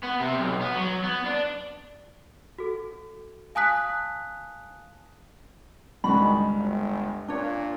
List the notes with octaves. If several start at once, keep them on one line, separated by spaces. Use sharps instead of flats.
B3
C3
B1
B3
F#3
B3
D4
F#4 A4
F5 G#5 A5 D#6 F#6 B6
C#2 G2 D#3 F#4 B5
G1
A#2 D4 C#5